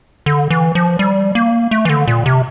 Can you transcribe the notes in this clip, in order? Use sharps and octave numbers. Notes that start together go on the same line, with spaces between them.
D3
E3
F3
G3
A#3
A3
E3
D3
A#2
C3